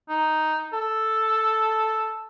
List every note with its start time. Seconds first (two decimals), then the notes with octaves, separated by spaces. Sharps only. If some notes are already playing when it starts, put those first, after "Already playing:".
0.10 D#4
0.73 A4